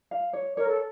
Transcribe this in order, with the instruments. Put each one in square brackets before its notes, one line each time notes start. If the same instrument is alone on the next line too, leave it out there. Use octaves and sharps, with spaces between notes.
[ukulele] F5
C#5
[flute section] A#4 [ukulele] C#5
[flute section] A4